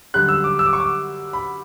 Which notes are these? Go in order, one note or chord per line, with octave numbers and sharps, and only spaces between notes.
F#2 D3 G3 F#6
E6
D6
E6
D6
C#6
D6
B5